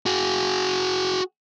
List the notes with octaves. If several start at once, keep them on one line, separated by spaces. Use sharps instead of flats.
F#4 G#4